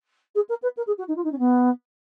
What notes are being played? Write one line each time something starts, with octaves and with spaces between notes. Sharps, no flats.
G#4
A#4
B4
A#4
G#4
F#4
D#4
F4
D#4
C#4
B3